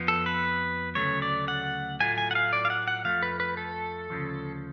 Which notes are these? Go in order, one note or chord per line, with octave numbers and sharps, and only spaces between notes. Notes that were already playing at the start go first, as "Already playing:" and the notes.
Already playing: F2 F3 B3
A4
B4
D2 C#3 F#3 A3 C#5
D5
F#5
A2 F#3 A3 F4 G#5
G#5
F#5
F5
D5
F5
F#5
F#5
F2 F3 A3 F5
B4
B4
A4
D2 C#3 F3